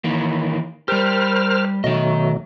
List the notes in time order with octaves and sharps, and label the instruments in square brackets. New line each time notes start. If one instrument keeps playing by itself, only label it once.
[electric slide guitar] D#3 E3 A#3
[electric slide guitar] G3 G4 [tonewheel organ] A#4 C5 F6
[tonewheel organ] B2 F#3 A3 [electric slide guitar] D#3 D#5